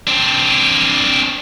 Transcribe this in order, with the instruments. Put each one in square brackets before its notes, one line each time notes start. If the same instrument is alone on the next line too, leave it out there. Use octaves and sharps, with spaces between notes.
[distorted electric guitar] C4 D4